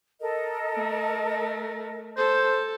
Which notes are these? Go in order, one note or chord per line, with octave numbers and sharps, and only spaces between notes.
A4 A#4 D#5
A3
A4 C5 G6